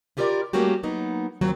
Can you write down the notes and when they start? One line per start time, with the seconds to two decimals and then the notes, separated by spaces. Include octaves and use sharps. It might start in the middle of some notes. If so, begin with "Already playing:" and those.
0.17 E4 F4 G4 A#4 C#5 D5
0.53 G3 A3 A#3 C#4 F#4 G4
0.83 F#3 A#3 B3 D#4
1.41 D#2 F3 F#3 C4